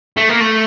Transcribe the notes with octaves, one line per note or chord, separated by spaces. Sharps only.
A3
A#3
A3